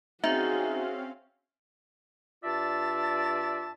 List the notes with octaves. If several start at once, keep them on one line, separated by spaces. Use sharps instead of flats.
C4 C#4 D#4 F#4 G#4 E5 F5
G2 F4 D5 E5 A5